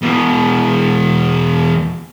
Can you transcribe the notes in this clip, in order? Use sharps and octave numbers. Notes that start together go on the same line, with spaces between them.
E2 B2